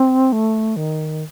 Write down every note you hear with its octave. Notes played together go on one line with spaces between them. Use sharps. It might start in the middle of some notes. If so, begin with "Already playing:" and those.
Already playing: C4
A3
D#3